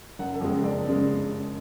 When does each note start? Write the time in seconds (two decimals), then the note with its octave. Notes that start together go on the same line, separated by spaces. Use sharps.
0.19 F#1 F#5
0.34 A4
0.41 F2 C#3 G#3
0.63 F#1 D5
0.87 C#3 G#3